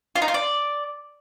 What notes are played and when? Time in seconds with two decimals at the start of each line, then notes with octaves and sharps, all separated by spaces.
0.15 F4
0.22 D#4
0.28 F4
0.34 D5